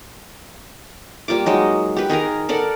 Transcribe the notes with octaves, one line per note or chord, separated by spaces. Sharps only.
G3 A#3 F4 D6
F#3 G#3 D#4
G4 B4
D#3 G#4 A#4 A#5
A4 A#4 D5 F#5